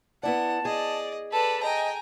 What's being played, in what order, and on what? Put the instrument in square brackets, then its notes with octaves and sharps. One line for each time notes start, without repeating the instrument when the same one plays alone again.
[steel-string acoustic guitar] B3 E4 D5 [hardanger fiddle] F#5 [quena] A5
[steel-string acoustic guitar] G#4 [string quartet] D5 [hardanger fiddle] D#5
[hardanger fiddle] A4 [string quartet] B4 D5 [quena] A5
[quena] D#5 [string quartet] G5 G#5 [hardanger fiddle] A#5